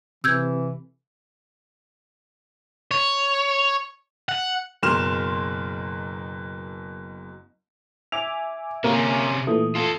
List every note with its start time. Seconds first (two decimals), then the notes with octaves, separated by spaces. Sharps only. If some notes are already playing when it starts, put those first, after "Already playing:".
0.24 C3 E3 E6 G6 G#6
2.91 C#5
4.29 F#5
4.83 F#1 B2 A#4 C6 F6 E7
8.12 E5 G#5 D6 F7
8.84 C3 A#3 C#4
9.47 A#2 E3 A3 D#6
9.75 F4 A4